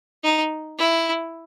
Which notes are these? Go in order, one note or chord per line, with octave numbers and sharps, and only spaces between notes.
D#4
E4